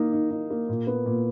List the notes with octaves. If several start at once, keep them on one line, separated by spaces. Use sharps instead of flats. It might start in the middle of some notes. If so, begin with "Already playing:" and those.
Already playing: D#3 A#3 D#4
D#4
D#4
A#3
A#2
B3
A#2